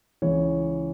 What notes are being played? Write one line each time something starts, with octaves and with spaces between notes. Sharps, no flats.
C#2 C#3 E3 C#5